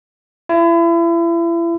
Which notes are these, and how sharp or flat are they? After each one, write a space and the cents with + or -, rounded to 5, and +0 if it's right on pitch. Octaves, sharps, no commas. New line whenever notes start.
E4 +35